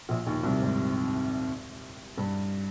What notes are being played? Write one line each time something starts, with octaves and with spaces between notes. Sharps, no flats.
A#1 A#2
D#2 D#3
C2 C3
G#2
G2